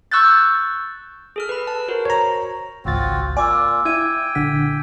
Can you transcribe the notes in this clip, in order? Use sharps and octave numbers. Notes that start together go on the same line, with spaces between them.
C#6 E6 F#6 G6 A6
G#4 A4 F6
B4 B5
A5
F#4 A#4 C5
C#5 A#5
G#1 C#2 C4 F4 F#4 A6
A#3 F4 D5 G#5 D6 E6
E4 E5 G5 G#6 D#7
A#1 D3 F#5 B6